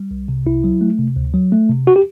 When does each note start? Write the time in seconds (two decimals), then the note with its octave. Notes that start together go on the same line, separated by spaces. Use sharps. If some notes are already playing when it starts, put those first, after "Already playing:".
Already playing: G3
0.11 C2
0.28 C3
0.46 C2 E4
0.64 F#3
0.81 A3
0.99 C3
1.16 D2
1.34 F#3
1.52 A3
1.69 C3
1.87 F#4
1.96 G4